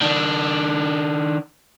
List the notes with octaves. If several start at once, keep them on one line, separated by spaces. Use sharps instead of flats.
D#3 D4